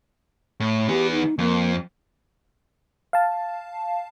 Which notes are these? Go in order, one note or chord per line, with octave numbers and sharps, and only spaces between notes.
A2
E3 B3 G4
D#4
F2 A#3
F5 A5